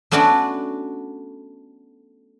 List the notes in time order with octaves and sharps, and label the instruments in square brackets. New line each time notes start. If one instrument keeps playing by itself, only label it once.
[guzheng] A3 B3 C#4 D4 F#4 D5